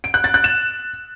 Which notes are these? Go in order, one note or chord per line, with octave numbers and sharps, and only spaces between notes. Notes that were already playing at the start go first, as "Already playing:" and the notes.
D7
F#6
A6
F#6
E7